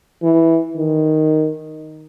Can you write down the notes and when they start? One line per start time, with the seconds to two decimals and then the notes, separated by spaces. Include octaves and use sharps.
0.22 E3
0.77 D#3